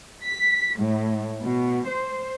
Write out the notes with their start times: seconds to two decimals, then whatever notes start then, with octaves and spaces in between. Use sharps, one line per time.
0.23 B6
0.77 A2
1.41 B2
1.86 C5